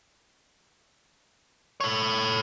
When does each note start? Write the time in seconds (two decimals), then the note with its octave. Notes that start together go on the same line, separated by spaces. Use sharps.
1.80 A4 C#5